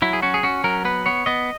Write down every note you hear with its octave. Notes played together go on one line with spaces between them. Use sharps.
F#3 E4
G#4
C#4 F#4
G#4
C#4 F#4
F#3 A#4
B3 B4
B3 C#5
B3 D#5